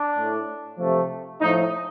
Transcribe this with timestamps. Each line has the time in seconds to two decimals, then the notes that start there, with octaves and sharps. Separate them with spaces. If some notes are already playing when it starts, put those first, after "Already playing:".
Already playing: D4
0.16 A2 A3
0.78 C3 F3 A3
1.41 A2 F3 A3 D#4